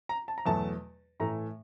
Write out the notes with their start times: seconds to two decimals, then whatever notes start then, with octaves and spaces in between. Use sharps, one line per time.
0.09 A#5
0.28 A5
0.38 A#5
0.46 E2 B2 F#3 A3 A5
1.20 A2 E3 A3 A#5